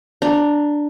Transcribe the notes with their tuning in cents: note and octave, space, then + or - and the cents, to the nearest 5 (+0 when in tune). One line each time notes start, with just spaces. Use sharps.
D4 +0 A#5 -10